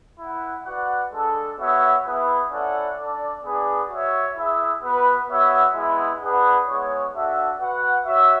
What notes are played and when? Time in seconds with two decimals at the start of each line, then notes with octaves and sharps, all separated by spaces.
0.19 E4 B4 F#5
0.66 F#4 B4 D5 F#5
1.12 G#3 D4 A4
1.58 B3 F#4 C#5 E5
2.05 B3 E4 G#4 B4
2.50 C#4 E4 A4 D5 F#5
2.97 D4 A4 D5
3.43 B3 D4 G#4 B4 D5
3.89 F#4 C#5 E5
4.36 E4 G#4 B4 E5
4.82 B3 F#4 B4
5.28 B3 F#4 C#5 E5
5.74 G#3 B3 E4
6.21 D4 G#4 B4 F#5
6.67 G#3 B3 E4 G#4 C#5
7.14 D4 F#4 A4 E5
7.59 F#4 B4 F#5
8.06 F#4 C#5 E5